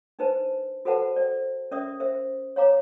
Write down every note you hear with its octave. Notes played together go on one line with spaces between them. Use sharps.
D4 D#4 B4 C5 A5
F#4 A4 B4 C5 F#5 A5
C5 D5
C#4 A#4 D5 E5 D#6
A#4 C5 E5
C#5 F5 A#5 D6